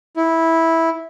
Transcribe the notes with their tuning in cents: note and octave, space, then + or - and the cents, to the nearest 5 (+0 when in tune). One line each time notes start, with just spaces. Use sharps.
E4 -10